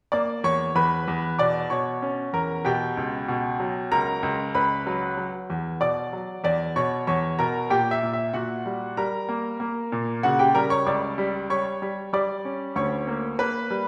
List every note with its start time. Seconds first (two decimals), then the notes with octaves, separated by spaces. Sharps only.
0.12 A#3 D5 D6
0.44 E2 C#5 C#6
0.75 E2 B4 B5
1.08 E2
1.39 B2 D5 D6
1.70 B2 C#5 C#6
2.02 C#4
2.33 E2 A#4 A#5
2.65 B2 G4 G5
2.97 C#2
3.28 B2
3.60 F#3
3.91 C#2 A#4 A#5
4.23 C#2
4.54 C#2 B4 B5
4.87 F#3
5.17 F#3
5.50 E2
5.81 B2 D5 D6
6.13 F#3
6.44 E2 D5 D6
6.76 B2 C#5 C#6
7.07 E2 C#5 C#6
7.39 B2 A#4 A#5
7.70 A#2 G4 G5
7.91 E5
8.03 A#2
8.13 E5
8.34 A#2 F#4 F#5
8.66 G3
8.97 G3 A#4 A#5
9.29 A#3
9.60 A#3
9.92 A#2
10.23 C#3 F#4 F#5
10.39 G4 G5
10.54 G3 A#4 A#5
10.70 C#5 C#6
10.86 C#2 D5 D6
11.18 G3
11.50 G3 C#5 C#6
11.82 G3
12.13 G3 D5 D6
12.45 C#4
12.76 D2 C#5 C#6
13.07 A#3
13.39 A#3 B4 B5
13.71 G3